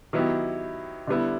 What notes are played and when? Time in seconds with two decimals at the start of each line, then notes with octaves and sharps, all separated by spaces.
0.13 D#3 F#3 B3 E4 G4
1.07 D3 G3 B3 E4